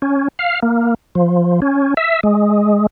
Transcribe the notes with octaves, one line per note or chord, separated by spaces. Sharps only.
C#4
F5
A#3
F3
C#4
E5
G#3